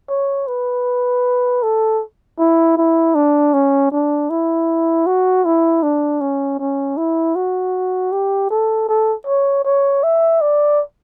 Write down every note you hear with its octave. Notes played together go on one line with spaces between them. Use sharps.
C#5
B4
A4
E4
E4
D4
C#4
D4
E4
F#4
E4
D4
C#4
C#4
E4
F#4
G4
A4
A4
C#5
C#5
E5
D5